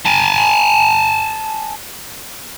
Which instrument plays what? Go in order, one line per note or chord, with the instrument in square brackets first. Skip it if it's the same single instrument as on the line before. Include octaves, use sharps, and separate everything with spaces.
[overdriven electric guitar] G#5 A5